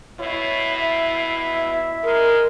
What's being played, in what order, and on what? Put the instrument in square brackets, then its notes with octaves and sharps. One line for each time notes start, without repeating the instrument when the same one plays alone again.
[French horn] B2 [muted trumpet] E4 [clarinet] C#5
[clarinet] E5
[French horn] G#3 [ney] A#4